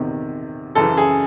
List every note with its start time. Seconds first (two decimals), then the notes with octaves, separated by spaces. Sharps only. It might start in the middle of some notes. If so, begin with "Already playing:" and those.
Already playing: E2 C3 D#3
0.75 F#2 C#3 E3 A4
0.97 G#4